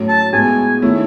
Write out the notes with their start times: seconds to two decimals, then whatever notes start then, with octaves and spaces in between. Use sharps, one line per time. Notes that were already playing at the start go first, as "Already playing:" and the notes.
Already playing: A2 F#3 A3 C#4
0.09 A5
0.33 A2 G#3 B3 F#4 G#5
0.82 D#3 A3 C#4 E4